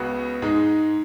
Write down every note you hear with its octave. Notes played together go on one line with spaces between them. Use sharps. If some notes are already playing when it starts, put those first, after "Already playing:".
Already playing: C#2 C#3 B3 F#4
G#2 G#3 D#4